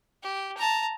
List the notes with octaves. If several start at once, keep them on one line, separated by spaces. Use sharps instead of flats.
G4
A5 A#5